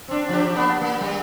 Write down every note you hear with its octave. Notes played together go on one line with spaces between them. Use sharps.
C4 D4
F3 D4 G4
A#3 B3 D4
A#3
G3